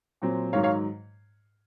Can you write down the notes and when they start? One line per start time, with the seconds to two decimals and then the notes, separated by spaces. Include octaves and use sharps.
0.22 A#2 F#3 C4
0.53 G#2 D#3 F#3 C#5 F5
0.63 C#5 F5